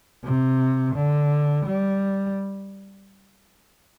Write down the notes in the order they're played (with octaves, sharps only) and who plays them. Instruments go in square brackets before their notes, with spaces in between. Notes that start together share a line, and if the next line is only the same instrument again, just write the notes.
[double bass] C3
D3
G3